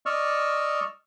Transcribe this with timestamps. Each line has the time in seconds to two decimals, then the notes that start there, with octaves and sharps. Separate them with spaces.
0.06 D5 D#5 C#6 E6 F6